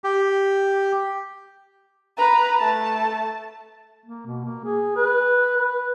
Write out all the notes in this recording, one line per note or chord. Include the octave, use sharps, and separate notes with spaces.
G4
B4 A#5
A3 A5
A#3
B2
A#3
G#4
B4
B4